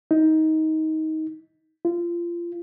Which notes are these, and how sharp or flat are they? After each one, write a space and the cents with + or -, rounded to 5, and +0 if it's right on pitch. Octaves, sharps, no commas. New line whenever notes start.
D#4 +20
F4 -25